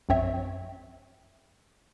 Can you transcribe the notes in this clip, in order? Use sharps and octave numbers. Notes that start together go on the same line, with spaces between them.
A#1 F#2 C4 C#5 E5